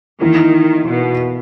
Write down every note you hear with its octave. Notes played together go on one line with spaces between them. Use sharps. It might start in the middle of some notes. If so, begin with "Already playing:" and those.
D#3 E3 A#3 E4 A#4
B2